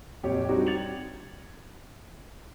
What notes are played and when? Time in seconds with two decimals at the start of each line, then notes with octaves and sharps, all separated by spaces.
0.23 A#1 F2 G4 C#5
0.49 G3 C4 D4 D#4 F#4 G4
0.66 G#6 A6 C#7 F7 F#7